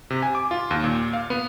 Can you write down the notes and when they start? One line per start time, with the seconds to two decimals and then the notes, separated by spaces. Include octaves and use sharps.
0.10 C3
0.23 G#5
0.35 D6
0.51 F4
0.71 D#2
0.84 A#2
1.13 F5
1.30 B3